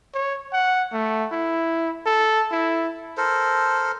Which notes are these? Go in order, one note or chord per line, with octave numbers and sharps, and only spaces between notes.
C#5
F#5
A3
E4
A4
E4
A4 A#4 C5